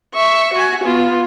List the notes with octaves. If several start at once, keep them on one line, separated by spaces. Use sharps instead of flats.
E5 C#6
F#4 G#5
B3 F4